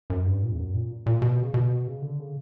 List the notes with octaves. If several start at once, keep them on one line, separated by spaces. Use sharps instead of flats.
F#2
G2
A#2
E2
F#2
A#2
A#2
B2
C#3
B2
C#3
D3
C#3